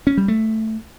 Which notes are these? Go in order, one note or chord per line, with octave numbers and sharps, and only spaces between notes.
C#4
G3
A3